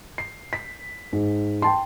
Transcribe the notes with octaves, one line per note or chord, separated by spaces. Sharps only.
C7
B6
G#2
G5 A5 C6